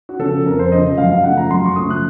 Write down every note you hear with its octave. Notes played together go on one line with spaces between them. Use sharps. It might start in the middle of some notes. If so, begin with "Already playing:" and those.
F#4
C#3 F3 A4
F2 A#4
C5
C#3 F3 D#5
F#2 F5
F5
C#3 F3 A3 F#5
A#5
F#2 C6
C#6
C#3 F3 A3 D#6
F#6